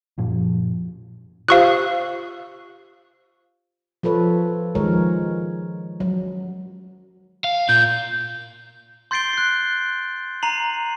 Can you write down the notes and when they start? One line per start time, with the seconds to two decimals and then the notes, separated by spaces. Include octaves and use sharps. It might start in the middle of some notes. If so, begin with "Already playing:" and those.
0.18 F#2 A#2 F3
1.48 F4 G4 C5 F5 C#6 F#6
4.03 F3 F4 A4 B4 C#5
4.75 D#3 F3 G#3 A#4 C#5
6.00 F#3
7.44 F5
7.69 A#2 G6
9.11 C6 G6 A6 C7 D7 G7
9.33 F#6 C7
10.42 A#5 C7 D#7 F7 F#7